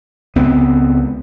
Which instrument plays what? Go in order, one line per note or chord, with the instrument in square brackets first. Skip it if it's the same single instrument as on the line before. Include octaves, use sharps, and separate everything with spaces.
[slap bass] C#2 B3 C4